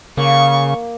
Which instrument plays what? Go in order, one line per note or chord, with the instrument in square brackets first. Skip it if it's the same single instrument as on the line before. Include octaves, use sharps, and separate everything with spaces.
[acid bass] C#3 [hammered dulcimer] A#3 [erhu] C#6